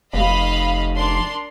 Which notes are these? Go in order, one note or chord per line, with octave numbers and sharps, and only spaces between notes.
F1 D#5 F5 B5
D4 A#4 C6